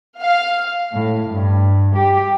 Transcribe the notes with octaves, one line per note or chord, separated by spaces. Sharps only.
F5
A2
G2
G4